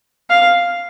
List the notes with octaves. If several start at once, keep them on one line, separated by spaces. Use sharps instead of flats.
F5